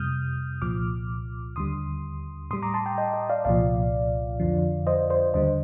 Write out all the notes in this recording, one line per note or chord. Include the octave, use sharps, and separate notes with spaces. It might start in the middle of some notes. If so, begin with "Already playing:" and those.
Already playing: F2 C3 G3 D#6 F6 G6
C2 A#2 F3 D6 F6
D#2 D3 G3 C6 D#6
A2 G3 C6 D#6
A#5 D6
A5 C6
G5 A#5
D#5 G5
D#5 G5
D5 F5
C2 A#2 F3 D5 F5
F2 D3 F3
C5 D#5
C5
D#2 D3 G3 C5 D#5